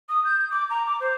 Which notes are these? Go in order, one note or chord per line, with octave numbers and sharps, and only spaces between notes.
D#6
G6
D6
A#5
D6
C5